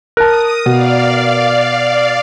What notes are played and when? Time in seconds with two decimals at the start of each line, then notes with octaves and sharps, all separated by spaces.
0.17 A#4 A5 D#6 F#6
0.66 B2 D5 F5